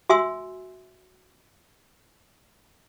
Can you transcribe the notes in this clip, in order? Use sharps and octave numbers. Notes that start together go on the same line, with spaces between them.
F#4 E5 G#5 C6 E6